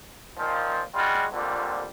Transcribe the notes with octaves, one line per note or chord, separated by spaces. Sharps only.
A#2 D#3 F3
G3 G#3 F4 F#4
F2 A#2 D3 G3